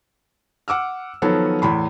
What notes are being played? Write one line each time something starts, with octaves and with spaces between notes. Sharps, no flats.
F#5 D6 E6 F6
D#3 F3 F#3 B3 A4 C#5
E2 A2 B5 C6